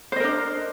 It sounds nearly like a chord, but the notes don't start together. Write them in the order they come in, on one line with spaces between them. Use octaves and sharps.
C5 D#5 A#4 D4